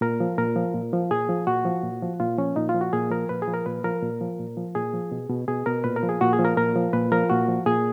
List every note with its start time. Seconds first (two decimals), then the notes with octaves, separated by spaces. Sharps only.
0.01 A#2 A#4
0.20 F3
0.38 A#2 A#4
0.56 F3
0.74 A#2
0.93 F3
1.11 A#2 G#4
1.29 F3
1.47 A#2 F#4
1.65 F3
1.83 A#2
2.02 F3
2.20 A#2 F4
2.38 F3 C#4
2.56 A#2 D#4
2.69 F4
2.74 F3
2.81 F#4
2.93 A#2 G#4
3.11 F3 A#4
3.29 A#2 B4
3.42 G#4
3.48 F3
3.54 A#4
3.66 A#2 B4
3.84 F3 A#4
4.03 A#2
4.21 F3
4.39 A#2
4.57 F3
4.75 A#2 G#4
4.94 F3
5.12 B2
5.30 B2
5.48 B2 G#4
5.66 B2 A#4
5.84 A#2 B4
5.96 A#4
6.03 F3
6.09 G#4
6.21 A#2 F#4
6.33 G#4
6.39 F3
6.45 A#4
6.57 A#2 A#4
6.76 F3
6.93 A#2 B4
7.12 F3 A#4
7.30 A#2 F#4
7.48 F3
7.66 A#2 G#4